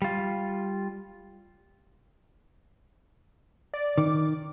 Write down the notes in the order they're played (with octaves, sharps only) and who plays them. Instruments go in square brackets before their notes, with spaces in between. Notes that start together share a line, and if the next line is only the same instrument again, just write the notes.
[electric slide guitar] G3 F4
[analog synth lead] D5
[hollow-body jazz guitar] D#3 [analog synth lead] D6